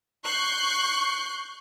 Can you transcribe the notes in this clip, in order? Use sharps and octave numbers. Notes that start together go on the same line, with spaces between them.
C#6 F#6 G6 C7